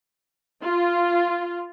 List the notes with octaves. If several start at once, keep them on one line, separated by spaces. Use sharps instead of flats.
F4